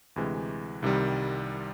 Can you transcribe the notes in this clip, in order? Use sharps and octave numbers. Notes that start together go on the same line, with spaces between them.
D2 C3 E3 G#3
C2 C3 D#3 G3